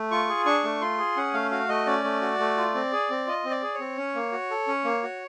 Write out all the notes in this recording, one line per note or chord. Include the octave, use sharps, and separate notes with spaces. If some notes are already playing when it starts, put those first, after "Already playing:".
Already playing: A3
F4 C#6
G#4
D4 C#6
A3
F4 C6
G#4
C#4 F#5
A3 F5
F#4 F5
A3 D#5
C#4 D5
A3
F#4
A3
F4
C4
G#4
C4
F4 D#5
C4
D5
G#4
C#5
C4
C#4
A#3
F#4
A4
C#4
A#3
F#4